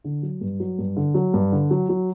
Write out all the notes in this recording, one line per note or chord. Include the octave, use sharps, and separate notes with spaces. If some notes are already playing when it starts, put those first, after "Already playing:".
D3
F#3
G2
F#3
G2
D3
F#3
G2
D3
F#3
F#3